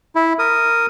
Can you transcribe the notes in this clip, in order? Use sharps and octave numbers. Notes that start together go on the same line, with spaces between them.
E4
A#4 D#6